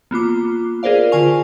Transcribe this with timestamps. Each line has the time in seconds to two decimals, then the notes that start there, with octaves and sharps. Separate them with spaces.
0.11 A#3 B3 F4 D6
0.83 F4 G#4 A#4 C5 D5 F5
1.12 D3 F4 G#5 C#6 F7